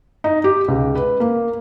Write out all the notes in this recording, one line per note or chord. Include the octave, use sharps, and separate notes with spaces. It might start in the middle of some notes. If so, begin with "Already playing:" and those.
D#4
G4
C#2
B4
A#3